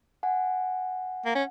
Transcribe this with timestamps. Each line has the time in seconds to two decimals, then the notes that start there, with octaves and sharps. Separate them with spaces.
0.23 F#5 G#5
1.26 A#3
1.35 C#4